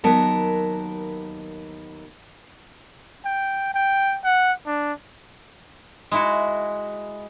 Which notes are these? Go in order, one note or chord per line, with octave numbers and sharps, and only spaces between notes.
D#2 F#3 B3 A#4 A5
G5
G5
F#5
D4
G#3 E4 F#4